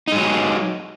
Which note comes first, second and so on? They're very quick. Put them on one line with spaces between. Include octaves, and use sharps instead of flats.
D#4 G#3 F#3